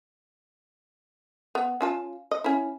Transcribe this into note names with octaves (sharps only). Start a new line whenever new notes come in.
B3
C#4 F4 A5
D#5
C#4 E4